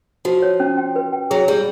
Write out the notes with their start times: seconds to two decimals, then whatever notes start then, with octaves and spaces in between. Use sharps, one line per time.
0.25 F3 F#4
0.42 C#5
0.60 C#4
0.77 G5
0.96 B4
1.12 G5
1.30 F#3 G#4
1.48 G3 G#4